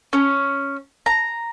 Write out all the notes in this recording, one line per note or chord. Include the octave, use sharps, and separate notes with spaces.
C#4
A#5